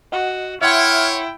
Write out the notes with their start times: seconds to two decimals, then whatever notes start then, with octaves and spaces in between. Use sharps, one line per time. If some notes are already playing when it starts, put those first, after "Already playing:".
0.12 F#4 D#5 F#5
0.61 E4 C#5 E5 F#5 G5 C6 F6